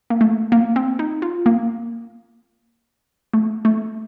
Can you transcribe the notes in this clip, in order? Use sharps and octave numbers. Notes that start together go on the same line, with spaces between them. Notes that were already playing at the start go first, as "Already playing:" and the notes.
A#3
A3
A#3
C4
D#4
F4
A#3
A3
A3